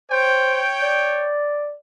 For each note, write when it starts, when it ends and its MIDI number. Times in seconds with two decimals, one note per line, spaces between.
0.11 0.61 72
0.11 1.37 73
0.11 1.37 79
0.82 1.74 74